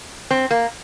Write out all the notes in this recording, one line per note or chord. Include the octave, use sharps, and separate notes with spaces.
C4
A#3